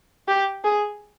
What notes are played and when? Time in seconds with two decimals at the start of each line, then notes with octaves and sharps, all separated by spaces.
0.28 G4
0.64 G#4